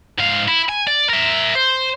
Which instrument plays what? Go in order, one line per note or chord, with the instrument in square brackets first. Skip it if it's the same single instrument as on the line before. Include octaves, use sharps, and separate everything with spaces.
[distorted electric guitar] G#2 F5
E4
G#5
D5
A#4 E5
C5